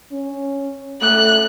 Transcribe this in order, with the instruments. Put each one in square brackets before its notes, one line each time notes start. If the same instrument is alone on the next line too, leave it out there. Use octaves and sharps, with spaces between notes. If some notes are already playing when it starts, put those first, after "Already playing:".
[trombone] C#4
[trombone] A3 [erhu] F#6